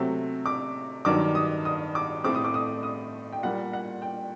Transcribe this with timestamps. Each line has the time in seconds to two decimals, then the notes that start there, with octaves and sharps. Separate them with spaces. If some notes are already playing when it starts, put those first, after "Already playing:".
Already playing: C3 F#3 A3 C4
0.46 D6
1.05 G2 D#3 F#3 D6
1.35 D#6
1.65 D#6
1.95 D6
2.24 A2 A3 C4 D6
2.35 D#6
2.44 D6
2.54 D#6
2.83 D#6
3.32 G5
3.43 A#2 G3 A#3 F#5
3.73 F#5
4.02 G5